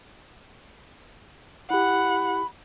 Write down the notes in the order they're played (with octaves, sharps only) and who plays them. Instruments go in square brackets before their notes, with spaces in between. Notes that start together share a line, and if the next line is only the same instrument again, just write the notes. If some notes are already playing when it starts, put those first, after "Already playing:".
[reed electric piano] E4 G4 [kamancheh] F#5 [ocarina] B5